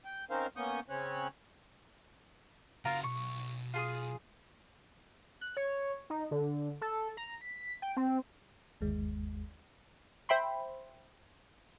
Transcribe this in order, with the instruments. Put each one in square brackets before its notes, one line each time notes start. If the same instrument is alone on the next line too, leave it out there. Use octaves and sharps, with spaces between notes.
[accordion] G5
C4 C#4 D#4 A#4 C5 F5
A#3 B3 C#4 C#6 D#6 G6
C#3 C4 C#4 C#5 F#6
[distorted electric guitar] C#3 F#4 [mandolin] F4 A#4 A#5
[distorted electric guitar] B1 [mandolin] C#6
[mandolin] F4 G#4 D#6
[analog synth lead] F#6
C#5
D#4
D3
A4
A#5
B6
G5
C4
[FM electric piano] G1 D#2 G#3
[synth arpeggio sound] C5 E5 G5 B5 C6